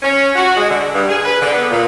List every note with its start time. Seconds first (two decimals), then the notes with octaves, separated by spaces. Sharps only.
0.02 C#4
0.36 F#4
0.57 G#3
0.69 D3
0.94 G2
1.08 G#4
1.25 B4
1.41 D3
1.53 B3
1.70 A#2